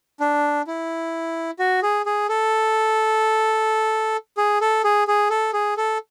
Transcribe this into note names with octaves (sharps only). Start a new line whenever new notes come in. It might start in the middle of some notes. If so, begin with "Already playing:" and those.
D4
E4
F#4
G#4
G#4
A4
G#4
A4
G#4
G#4
A4
G#4
A4